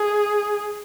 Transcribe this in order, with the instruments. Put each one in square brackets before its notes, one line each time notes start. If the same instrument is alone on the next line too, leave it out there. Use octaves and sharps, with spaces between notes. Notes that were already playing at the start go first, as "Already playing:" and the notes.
Already playing: [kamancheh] G#4